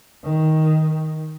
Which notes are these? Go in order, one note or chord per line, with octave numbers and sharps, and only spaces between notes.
D#3